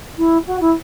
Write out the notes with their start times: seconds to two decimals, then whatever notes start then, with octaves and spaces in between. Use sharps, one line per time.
0.17 E4
0.46 F#4
0.60 E4